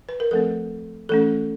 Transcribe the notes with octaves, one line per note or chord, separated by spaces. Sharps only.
B4
A#4
F3 A3 C4 A4
E3 A3 C#4 A4